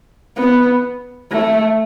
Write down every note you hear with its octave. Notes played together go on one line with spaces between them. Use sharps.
B3
A3